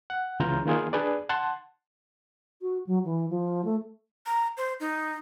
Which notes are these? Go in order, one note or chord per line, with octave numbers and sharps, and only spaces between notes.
F#5
C#2 C#3 E3 F4 A#5 G6
D#3 A#3 F4 G#4
D4 G#4 B4 D5
F#5 A5 C6
F#4
F#3
E3
F3
A3
A#5
C5
D#4